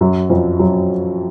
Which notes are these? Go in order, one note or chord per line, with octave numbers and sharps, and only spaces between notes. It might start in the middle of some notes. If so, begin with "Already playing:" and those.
F#2 F#3
F2 F3
F#2 F#3